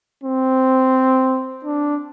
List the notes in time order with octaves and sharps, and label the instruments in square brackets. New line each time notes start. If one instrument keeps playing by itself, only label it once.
[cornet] C4
D4